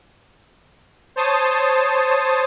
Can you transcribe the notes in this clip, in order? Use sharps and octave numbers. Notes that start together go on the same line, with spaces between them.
C5 C#5 A5 D#6